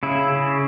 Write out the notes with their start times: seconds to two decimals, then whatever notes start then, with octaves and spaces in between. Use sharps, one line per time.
0.03 C#3 E4
0.32 C#3